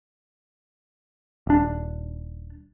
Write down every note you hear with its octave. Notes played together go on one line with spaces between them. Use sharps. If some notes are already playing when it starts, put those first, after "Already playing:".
D#1 D4